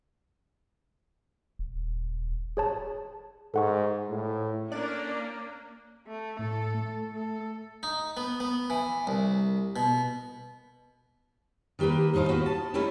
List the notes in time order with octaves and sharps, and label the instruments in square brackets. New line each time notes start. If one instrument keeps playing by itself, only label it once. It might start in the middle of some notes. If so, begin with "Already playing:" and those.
[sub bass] D#1
[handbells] G#4 C#5 A5
[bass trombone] G#2 [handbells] A4 F#5 C#6
[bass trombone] A2
[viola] A#3 [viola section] C#4 A#4 [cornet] D4 [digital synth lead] D5
[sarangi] A3
[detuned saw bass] A2 [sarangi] A4
[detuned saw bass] A3
[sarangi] A4
[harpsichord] D#4
B3
B3
E3
C2
B2
[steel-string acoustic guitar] D#3 A#3 G4 A#4 B4
D#2 A2 D#4 C5 F5
B3 F#4 G4
A5
A3 C#4 D#4 E4 G4 A#4